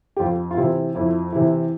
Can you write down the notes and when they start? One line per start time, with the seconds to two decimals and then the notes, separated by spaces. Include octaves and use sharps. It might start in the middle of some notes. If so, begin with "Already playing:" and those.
0.17 G4
0.19 F2 F4
0.51 F4
0.57 C3 E3 E4
0.95 F2 E4
1.32 C3 E3 E4